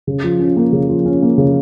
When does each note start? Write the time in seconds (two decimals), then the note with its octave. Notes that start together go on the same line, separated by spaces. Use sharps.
0.07 C#3
0.24 F3
0.39 C#4
0.56 A#3
0.72 C#3
0.89 F3
1.06 C#4
1.22 A#3
1.38 C#3